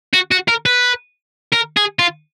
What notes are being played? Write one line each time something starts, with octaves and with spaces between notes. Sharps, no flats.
F#4
F#4
A#4
B4
A#4
G#4
F4